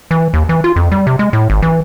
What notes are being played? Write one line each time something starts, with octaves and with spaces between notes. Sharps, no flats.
E3
D#2
E3
F4
F2
G3
C3
G#3
A2
G#1
E3